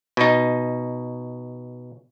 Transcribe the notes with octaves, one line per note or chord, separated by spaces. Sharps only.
B2 D#4